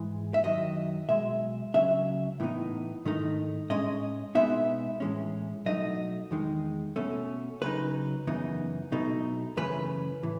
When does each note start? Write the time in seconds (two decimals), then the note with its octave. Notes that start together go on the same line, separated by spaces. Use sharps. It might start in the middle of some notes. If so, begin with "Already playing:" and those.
Already playing: G#2 E3 G#3
0.34 E5
0.43 F#2 D#3 F#3 D#5
1.09 B1 B2 G#3 E5
1.74 C#2 C#3 F#3 C#4 E5
2.40 A2 E3 B3 D#4
3.05 G#2 D#3 A3 D#4
3.70 A2 G#3 C#4 D#5
4.35 B2 G#3 B3 D#4 E5
5.00 A2 E3 G#3 C#4
5.65 B2 F#3 A3 D#4 D#5
6.31 E2 D#3 G#3 D#4
6.96 B2 A3 C#4
7.61 C#2 C#3 F#3 D#4 B4
8.27 F#2 C#3 E3 B3 D#4
8.92 B1 B2 A3 D#4
9.57 F#2 C#3 E3 A3 C#4 B4
10.23 A2 E3